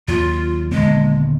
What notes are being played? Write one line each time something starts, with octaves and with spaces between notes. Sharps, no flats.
D#2 F#3 F4
D#1 D3 G#3 B3